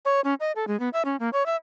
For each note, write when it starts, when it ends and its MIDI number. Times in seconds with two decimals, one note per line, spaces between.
0.05 0.21 73
0.24 0.34 61
0.40 0.52 75
0.56 0.67 69
0.67 0.79 56
0.80 0.89 59
0.93 1.02 76
1.05 1.16 61
1.20 1.29 58
1.33 1.45 73
1.46 1.56 76